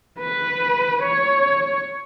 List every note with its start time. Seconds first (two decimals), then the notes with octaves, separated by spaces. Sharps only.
0.18 B4
1.02 C#5